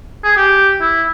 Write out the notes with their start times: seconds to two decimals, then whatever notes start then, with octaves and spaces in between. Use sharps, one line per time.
0.24 G#4
0.37 G4
0.81 E4